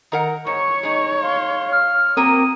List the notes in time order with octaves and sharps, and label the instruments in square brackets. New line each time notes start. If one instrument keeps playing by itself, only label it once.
[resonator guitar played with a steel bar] D#3 A#4 F#5
[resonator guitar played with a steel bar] G#2 [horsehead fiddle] C#5 [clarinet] C#6
[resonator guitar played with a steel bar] G#3 D#4
[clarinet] F5 [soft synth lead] C6
[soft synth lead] F6
[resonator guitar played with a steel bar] F#3 A#3 A#4 [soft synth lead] C4 [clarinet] D#6